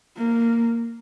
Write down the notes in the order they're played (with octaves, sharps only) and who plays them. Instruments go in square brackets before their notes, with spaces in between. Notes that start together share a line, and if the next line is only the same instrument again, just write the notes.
[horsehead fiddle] A#3